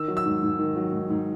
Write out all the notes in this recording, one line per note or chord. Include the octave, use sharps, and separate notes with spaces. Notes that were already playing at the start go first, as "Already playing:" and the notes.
Already playing: D#3 E6
F#3
E6
G#2
G#2
D#3
F#3
G#2
G#2